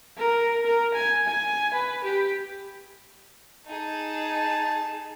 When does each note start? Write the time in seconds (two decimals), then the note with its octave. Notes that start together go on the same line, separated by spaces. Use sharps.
0.18 A#4
0.66 A#4
0.94 G#5
1.28 G#5
1.74 B4
2.04 G4
3.66 D#4 G#4 A5